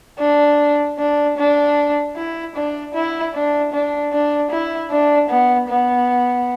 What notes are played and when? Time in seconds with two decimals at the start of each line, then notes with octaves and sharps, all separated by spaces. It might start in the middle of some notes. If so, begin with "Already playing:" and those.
0.19 D4
0.99 D4
1.37 D4
2.16 E4
2.55 D4
2.94 E4
3.34 D4
3.73 D4
4.13 D4
4.51 E4
4.90 D4
5.29 B3
5.69 B3